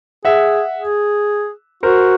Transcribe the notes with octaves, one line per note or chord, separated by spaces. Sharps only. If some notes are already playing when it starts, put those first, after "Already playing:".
G#4 E5 F#5
G#4
F#4 A#4 C5